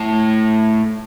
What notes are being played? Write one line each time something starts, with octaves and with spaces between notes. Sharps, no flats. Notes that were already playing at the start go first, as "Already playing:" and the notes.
Already playing: A2